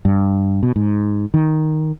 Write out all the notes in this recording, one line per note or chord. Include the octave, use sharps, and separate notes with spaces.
G2
B2
G#2
D#3